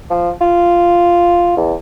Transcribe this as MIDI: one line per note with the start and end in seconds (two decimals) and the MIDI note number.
0.11 0.30 53
0.41 1.53 65
1.57 1.74 40